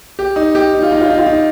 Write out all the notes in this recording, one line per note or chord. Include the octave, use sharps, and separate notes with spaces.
G4
D#4
G4
D#4
F4
D#4
F4
D#4
F4
D#4